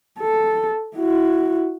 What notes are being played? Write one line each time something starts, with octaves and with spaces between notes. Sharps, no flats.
A4
E4 F#4